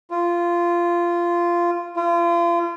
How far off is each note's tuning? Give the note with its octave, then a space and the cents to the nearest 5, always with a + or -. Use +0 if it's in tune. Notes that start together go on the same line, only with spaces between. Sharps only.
F4 -15
F4 -35